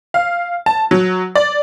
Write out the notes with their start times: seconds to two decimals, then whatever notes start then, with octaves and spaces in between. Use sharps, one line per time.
0.14 F5
0.66 A5
0.91 F#3
1.35 D5